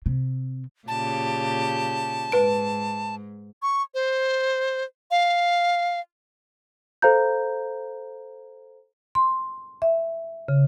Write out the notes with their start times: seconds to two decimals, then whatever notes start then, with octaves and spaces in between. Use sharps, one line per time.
0.06 C3
0.88 A#2 C#3 G4 A5
2.32 G#2 B4 D7
3.62 C#6
3.94 C5
5.11 F5
7.02 A4 C5 F5 A#5 G6
9.15 C6
9.82 E5
10.48 C#3